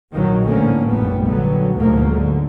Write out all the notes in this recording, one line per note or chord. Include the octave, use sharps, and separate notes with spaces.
A#1 D#3 F#3
E2 A2 D3 F3 A#3 C#4
F1 A#1 F#2 A#2 G3 B3
D3 F#3 G3 B3
D2 G#2 B2 F3 F#3 A#3
D3